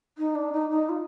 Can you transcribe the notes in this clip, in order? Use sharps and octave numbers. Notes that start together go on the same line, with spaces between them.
D#4
D4
D#4
D#4
F4